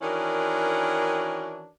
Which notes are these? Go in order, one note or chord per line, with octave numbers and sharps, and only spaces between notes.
D#3 E3 C#4 D4 F#4 A#4